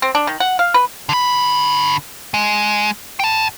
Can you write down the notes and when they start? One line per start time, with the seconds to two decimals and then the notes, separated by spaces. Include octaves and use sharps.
0.02 C4
0.15 D4
0.27 D#3
0.40 F#5
0.59 F5
0.74 B4
1.09 D3 B5
2.34 G#3
3.20 G5 A5